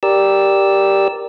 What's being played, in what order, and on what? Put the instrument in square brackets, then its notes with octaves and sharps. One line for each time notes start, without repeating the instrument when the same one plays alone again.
[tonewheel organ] G4 A#4 D5 E6